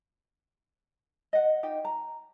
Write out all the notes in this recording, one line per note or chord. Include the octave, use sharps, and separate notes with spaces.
D#5 F#5
D#4 G4 G5
A#5